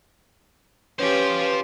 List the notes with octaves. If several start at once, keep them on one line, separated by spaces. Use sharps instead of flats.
C#4 F4 G4 B4 C5